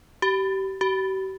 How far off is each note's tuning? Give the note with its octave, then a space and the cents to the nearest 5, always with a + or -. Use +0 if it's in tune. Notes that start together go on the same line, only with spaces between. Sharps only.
G4 -30
G4 -45